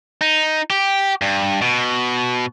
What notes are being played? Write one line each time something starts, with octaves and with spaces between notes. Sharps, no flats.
D#4
G4
G2
B2